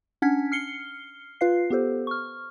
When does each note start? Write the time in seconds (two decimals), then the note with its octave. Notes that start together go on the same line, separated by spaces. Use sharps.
0.22 C#4 D4 F#5 F6 G#6 B6
0.52 F6 C7 C#7 G7
1.41 F4 B4 F5 C7
1.70 B3 G4 A4 C5
2.07 C#6 F6